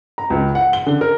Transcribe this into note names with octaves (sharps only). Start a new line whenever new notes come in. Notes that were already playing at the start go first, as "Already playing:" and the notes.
A#5
C#2
F#5
G7
D3
A#4